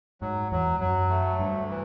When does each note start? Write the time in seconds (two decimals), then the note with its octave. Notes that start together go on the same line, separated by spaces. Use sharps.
0.21 G#2 F#3
0.52 E2 F#3
0.80 F#2 F#3
1.10 A3
1.39 D2 G2
1.69 E3